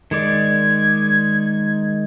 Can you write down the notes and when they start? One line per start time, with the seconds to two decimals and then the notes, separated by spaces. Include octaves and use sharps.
0.11 D#3 G#3 D5 G#6